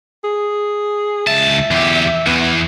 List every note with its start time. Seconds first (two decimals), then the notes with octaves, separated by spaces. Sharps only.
0.24 G#4
1.27 C#2 E5 A5
1.71 E2 G4
2.27 E2 E3 B3